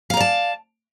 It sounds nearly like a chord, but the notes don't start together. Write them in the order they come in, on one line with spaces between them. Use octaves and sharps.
F5 A#5 D5 A5